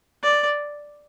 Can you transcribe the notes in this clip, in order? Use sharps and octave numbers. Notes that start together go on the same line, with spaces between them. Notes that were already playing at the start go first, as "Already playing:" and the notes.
D5